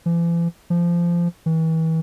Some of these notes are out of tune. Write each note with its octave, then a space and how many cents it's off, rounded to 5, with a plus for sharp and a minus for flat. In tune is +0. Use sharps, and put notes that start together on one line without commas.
E3 +45
F3 -20
E3 -35